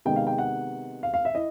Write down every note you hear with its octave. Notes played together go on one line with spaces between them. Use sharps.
C3 D#3 G#3 B3 G5
F5
G5
F#5
F5
F5
E5
E4 D#5